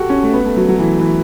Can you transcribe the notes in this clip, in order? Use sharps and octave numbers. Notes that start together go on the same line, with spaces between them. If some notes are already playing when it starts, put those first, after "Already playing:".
Already playing: F#4 G4 A4
C#4
A3
B3
A3
F#3
F#3
E3
E3